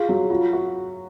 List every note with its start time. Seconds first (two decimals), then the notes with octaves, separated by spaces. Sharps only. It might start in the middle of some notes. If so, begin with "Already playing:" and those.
Already playing: F4 G#4
0.09 F#3
0.30 F4 F#4
0.41 F4
0.53 F#4